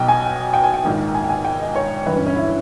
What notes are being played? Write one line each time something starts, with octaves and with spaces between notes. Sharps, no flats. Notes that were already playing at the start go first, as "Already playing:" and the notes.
Already playing: B1 B2 D#5 G5
G#5
G5
G#5
G5
A#1 G#2 D#3
G#5
G5
G#5
G5
D#5
C#5
G1 G2 E3 B4
C#4
C#4
E4